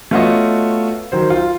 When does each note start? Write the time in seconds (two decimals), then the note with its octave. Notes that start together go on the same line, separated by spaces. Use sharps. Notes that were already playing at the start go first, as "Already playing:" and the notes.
0.11 A3 B3 F4 F#4 C#5 D#5
1.12 D#3 F#3 C5
1.30 F4